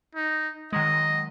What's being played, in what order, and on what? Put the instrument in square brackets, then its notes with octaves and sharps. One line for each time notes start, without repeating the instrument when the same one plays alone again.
[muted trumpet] D#4
[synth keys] D#3 F#3 G#3 [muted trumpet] D#5